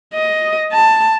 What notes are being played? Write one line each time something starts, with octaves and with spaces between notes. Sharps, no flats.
D#5
A5